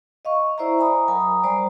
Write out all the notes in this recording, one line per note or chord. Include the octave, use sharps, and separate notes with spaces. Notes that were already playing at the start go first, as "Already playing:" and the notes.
D#5 F5 C#6
E4 C5 D5 E5 A#5
G#5 A#5 B5 D#6
F#3 A#4 G#5 A#5 B5 D#6
G3 C5 D5